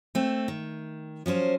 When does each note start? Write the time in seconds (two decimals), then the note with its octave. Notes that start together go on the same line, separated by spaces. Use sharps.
0.15 A3 C4
0.48 D#3
1.26 F3 F#3 C#4 C5